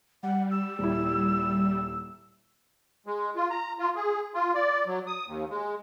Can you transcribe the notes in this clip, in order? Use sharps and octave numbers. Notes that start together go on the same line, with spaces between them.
G3 F#5
E6
D#1 E4
G#3
F4
A#5
F4
G#4
F4
D5
F#3
D#6
D#2
G#3